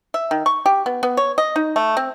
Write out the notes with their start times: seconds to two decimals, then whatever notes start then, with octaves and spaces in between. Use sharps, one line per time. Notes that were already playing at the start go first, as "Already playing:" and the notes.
0.14 E5
0.31 D#3
0.46 C#6
0.66 G4
0.86 B3
1.03 B3
1.17 C#5
1.38 D#5
1.56 D#4
1.76 A3
1.97 C4